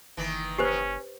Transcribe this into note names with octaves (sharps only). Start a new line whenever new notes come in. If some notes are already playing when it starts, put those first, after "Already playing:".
F#1 D#3 E3
C#4 G4 B4 C5